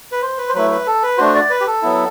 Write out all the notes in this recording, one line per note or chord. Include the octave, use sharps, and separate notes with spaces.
B4
C5
B4
C5
F#3 A3 E4 B4
B4
A4
B4
A3 D4 F#4 C5
D5
B4
G4
A4
F#3 B3 E4